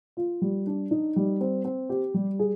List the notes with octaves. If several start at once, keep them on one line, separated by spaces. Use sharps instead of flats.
F4
G3
D4
D#4
G3
C4
C4
G4
G3
G#4